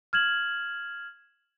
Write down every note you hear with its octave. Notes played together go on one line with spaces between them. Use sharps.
F6 G#6 E7 F#7